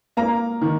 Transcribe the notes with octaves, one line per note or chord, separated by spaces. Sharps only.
A#3 A#5
D#3